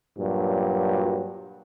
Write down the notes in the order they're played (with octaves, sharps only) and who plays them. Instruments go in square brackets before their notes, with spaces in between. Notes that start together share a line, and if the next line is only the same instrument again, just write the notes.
[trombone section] G2 A#2 F#3